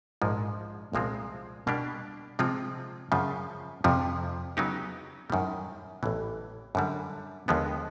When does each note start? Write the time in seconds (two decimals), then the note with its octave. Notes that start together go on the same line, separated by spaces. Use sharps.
0.22 A#1 G#2 F3 G#3
0.93 C2 A#2 F3 G#3 C4
1.67 B2 G3 A#3 D4 G4
2.39 C3 F3 G#3 C4 F4
3.12 F#2 C#3 F3
3.84 F2 C3 F3
4.57 C#3 F#3 B3 D#4 G4
5.30 F#2 D#3 G3
6.03 A1 A2 E3
6.75 F#2 D3 G3
7.48 D#2 D3 F3 G#3 B3